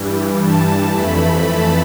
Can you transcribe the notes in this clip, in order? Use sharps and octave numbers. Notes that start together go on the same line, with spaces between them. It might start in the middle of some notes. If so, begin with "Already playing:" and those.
Already playing: G2 E3 G3
A5
F2 E3 A3 B5
A5